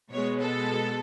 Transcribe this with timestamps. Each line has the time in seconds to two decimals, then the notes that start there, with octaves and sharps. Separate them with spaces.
0.11 B2 G#3 B3 C#5
0.41 A4